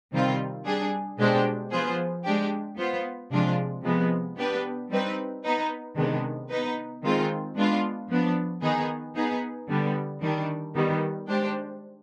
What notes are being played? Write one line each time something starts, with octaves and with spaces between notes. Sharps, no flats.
C3 D#3 G3 C4 F4
G3 D4 G#4
B2 G#3 D4 G4 C5
F3 B3 F4 G#4 C5
G#3 D4 G4
B3 F4 C5
C3 F3 G#3 D4 F4
C3 F3 G#3 B3
B3 D4 G4 B4
G3 C4 D#4 B4
B3 D#4 B4
C3 D#3 G#3 B3 D4
B3 D#4 B4
D#3 G#3 C4 F4
G#3 B3 D4 F4
F3 B3 D4
D#3 B3 D#4 G#4
B3 D#4 G#4 B4
D3 G3 B3
D#3 G3 D4
D#3 G3 B3
G#3 D4 G4 C5